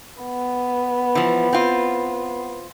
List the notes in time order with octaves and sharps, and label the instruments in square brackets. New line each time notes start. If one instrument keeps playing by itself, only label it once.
[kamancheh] B3
[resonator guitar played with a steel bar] E3 F3
C4 F4